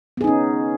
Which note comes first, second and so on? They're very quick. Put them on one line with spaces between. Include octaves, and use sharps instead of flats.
B3 G#4 D#4 C#4